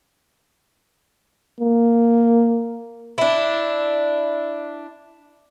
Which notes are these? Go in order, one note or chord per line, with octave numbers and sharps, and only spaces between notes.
A#3
D4 E4